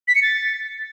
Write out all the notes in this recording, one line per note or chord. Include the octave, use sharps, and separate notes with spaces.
B6
C#7
A6